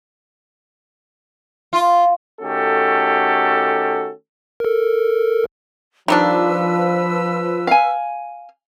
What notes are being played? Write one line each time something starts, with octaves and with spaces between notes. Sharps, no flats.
F4
D#3 A3 C#4 F#4 G4 A4
A4 A#4
D#3 F3 G3 D4 B4 E6
F5 G#5